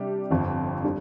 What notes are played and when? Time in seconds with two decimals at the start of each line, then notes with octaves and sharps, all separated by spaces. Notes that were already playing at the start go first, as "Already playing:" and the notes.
Already playing: C3 G3 D4 G4
0.30 G1 F2 F3 C4
0.84 D3 G3